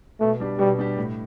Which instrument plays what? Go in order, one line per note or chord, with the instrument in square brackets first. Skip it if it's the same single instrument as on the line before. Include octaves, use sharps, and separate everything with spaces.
[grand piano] B2 [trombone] A3
[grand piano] G3 D4 G4
[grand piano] B2 [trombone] G3
[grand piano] G3 D4 G4
A2